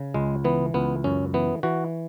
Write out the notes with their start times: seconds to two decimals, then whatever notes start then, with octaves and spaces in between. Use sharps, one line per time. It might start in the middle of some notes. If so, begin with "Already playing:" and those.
Already playing: C#3
0.14 C#2 G#3
0.44 E3 B3
0.74 C#2 B3
1.04 F#2 C#4
1.34 E3 B3
1.63 E3 F#4